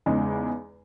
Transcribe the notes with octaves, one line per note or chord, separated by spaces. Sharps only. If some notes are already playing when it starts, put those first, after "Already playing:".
E2 C#3 G#3 D#4